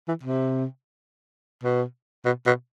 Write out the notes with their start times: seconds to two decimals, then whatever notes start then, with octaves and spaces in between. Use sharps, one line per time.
0.08 E3
0.23 C3
1.64 B2
2.25 B2
2.46 B2